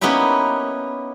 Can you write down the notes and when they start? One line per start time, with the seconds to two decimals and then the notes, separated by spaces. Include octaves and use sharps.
0.01 A#3 B3 C#4 D#4 E4 G4